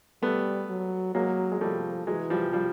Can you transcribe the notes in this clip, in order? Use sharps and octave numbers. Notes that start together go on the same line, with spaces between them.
G3 A3 B3
F#3
F#3 G#3 A#3
G#3
F3 G3 A3
E3 F#3 G#3
F3 G3
F3 G3